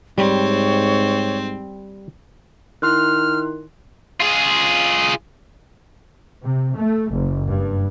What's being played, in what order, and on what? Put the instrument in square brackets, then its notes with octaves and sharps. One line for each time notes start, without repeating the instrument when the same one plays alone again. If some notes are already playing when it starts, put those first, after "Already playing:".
[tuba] G#2 [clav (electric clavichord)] G3 [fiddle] C4 [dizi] C#5
[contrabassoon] D#3 [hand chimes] E4 C6 F#6 [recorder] F6
[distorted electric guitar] F4 G#4
[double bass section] C3
A3
F#1
G2